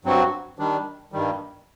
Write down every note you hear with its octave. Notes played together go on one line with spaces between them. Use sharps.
G2 F#3 C4 F#4
D#3 G3 D4
G2 D#3 G3